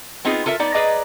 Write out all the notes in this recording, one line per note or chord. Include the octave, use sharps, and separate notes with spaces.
B3 C4 D#4 F4 G#4
F4 A4 A#4 E5
B3 D#4 D5
G#4 B4 D5 D#5 A#5